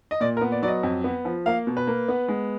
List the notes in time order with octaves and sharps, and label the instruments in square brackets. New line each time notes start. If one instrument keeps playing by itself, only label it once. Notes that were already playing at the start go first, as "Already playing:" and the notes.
[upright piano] D#5
A#2 D5
A#4
B3
D5
F#3 D5
D#5
F2
B3
F3
A#3 F5
B2
B4
A#3
B3
G#3